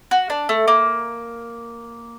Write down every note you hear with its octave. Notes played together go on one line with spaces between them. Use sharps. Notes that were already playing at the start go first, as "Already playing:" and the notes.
F#4
D4
A3
A#3